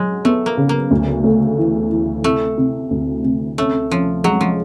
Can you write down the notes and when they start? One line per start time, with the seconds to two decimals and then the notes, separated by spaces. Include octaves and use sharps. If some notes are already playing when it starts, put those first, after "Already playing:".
Already playing: F#3 G#3
0.25 A3 B3
0.46 A#3
0.57 C#3
0.69 A#3
0.91 D2
1.24 A3
1.58 E3
1.91 E3
2.24 C3 A3
2.58 C3
2.91 D2
3.24 C3
3.58 A3 C#4
3.91 F3 C#4
4.24 F#3 G#3
4.41 F3